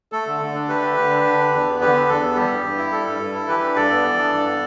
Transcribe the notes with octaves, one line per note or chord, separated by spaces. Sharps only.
A3 A4
D3
D3
D4
A3 G4 B4
D3
D3
D4
D3
D4
E2
B3
D3 G4 B4
D4
E2 A4
B3
G3 G4
G2
G2
E4
G3 A4
G2
G2
E4
E3 G4 B4
D4
G2 A4 D5
B3
E3
D4
G2
B3